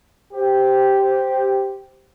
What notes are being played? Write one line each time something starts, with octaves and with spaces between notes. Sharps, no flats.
G4 C5